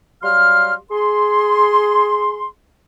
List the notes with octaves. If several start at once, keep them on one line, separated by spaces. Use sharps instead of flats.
F#3 G3 G4 F5 C6 F6
G#4 C6